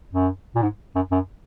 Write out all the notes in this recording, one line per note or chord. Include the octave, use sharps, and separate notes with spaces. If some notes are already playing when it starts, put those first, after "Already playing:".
F#2
A#2
G#2
F#2
F#2